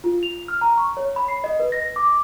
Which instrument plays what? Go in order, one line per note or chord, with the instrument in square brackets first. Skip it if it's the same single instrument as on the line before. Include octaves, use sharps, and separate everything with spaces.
[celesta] F4
F7
F6
A#5
C#6
C#5
B5
C7
D#5
B4
A#6
D6